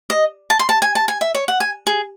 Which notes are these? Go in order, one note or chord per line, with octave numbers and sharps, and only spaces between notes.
D#5
A5
C6
A5
G#5
A5
G#5
E5
C#5
F#5
G#5
G#4